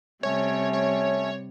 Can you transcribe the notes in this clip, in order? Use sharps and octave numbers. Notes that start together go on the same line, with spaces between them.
C3 G3 A3 C#4 C#5
C#5